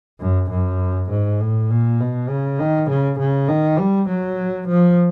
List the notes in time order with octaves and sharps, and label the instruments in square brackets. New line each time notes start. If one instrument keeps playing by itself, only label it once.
[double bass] F#2
F#2
G#2
A2
A#2
B2
C#3
D#3
C#3
C#3
D#3
G3
F#3
F3